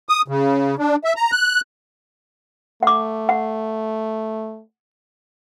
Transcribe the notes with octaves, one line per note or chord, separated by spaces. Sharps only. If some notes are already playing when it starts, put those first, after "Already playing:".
D#6
C#3
D4
E5
A#5
F#6
A3 F#5 D6
F#5